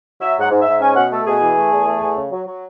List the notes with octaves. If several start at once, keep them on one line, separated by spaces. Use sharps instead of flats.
F#3 E5
G#2 F#5
G#2
E5
G#2
C#4 G#5
B2 F#5
A3 A4
B2 G#4
E3
A3
E2
A3
E2
C#3
F#3
F#3